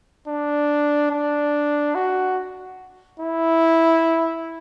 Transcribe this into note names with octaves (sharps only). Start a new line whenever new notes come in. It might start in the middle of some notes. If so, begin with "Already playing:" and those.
D4
D4
F#4
E4